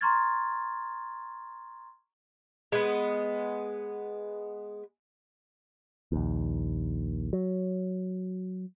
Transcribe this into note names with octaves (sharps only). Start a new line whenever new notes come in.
A#5 C6 C#6 F6 G#6 A6
G#3 B3
A#1 D#2
F#3